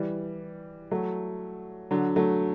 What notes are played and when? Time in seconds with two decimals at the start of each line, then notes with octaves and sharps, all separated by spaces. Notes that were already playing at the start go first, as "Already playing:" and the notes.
Already playing: E3 G3
0.91 F#3 A3
1.91 D3 F#3
2.16 F#3 A3